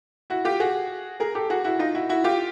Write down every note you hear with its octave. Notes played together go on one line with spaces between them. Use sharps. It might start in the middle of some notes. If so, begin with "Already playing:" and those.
E4 F#4
F4 G4
F#4 G#4
G#4 A#4
G4 A4
F#4 G#4
E4 F#4
D#4 F4
E4 F#4
E4 F#4
F4 G4